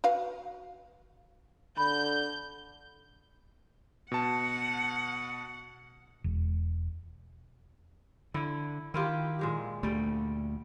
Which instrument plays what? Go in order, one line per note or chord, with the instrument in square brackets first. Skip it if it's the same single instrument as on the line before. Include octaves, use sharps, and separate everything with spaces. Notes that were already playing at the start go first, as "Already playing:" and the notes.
[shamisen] F#4 B4 F5
[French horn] D3 [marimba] B5 [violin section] G6
[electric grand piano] B2 A5 [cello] F#5
[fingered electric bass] E1
[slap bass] D3 [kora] E4
[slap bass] D#3 [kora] E4 F4 G4
[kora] A#2 G#3 G4
[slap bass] D2 A3 [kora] G3 G5